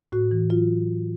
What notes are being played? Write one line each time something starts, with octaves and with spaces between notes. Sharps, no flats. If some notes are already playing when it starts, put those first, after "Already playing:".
A2 F#4
E3
F#3 F4